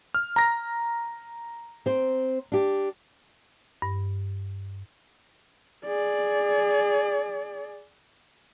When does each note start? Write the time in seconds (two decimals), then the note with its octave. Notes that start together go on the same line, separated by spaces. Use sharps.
0.15 F6
0.36 A#5 A#6
1.86 C4 C5
2.52 D4 G4
3.82 G2
5.86 G#4 D5